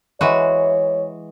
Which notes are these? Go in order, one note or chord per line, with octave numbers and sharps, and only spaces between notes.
E3 G#3 F#4 C#5